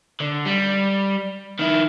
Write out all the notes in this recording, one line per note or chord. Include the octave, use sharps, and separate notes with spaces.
D3
G3
D#3 E4